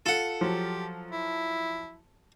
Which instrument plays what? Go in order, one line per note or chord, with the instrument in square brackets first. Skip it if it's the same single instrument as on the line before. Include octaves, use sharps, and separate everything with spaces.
[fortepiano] F4 [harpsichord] A4 F#5
[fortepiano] F3 F#3 [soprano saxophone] G4
[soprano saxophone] E4